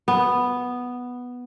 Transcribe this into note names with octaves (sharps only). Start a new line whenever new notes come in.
B3